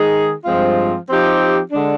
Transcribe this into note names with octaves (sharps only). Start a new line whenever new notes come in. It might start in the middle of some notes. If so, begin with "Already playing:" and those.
Already playing: D#3 G#3 D#4 G#4
G2 F3 G#3 C4 F4
F3 C4 D#4 G4
D3 G#3 D4